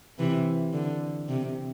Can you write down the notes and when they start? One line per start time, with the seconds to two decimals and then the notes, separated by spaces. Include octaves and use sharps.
0.19 C3 E3
0.73 D3
1.28 C3